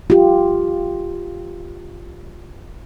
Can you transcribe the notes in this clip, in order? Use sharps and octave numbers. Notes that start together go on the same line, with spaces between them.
F4 G4